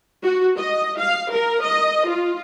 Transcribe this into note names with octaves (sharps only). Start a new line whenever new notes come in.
F#4
D#5
F5
A#4
D#5
F4